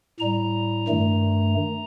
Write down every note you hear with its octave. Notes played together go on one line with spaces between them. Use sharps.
A2 G3 A#5
G2 D#3 A3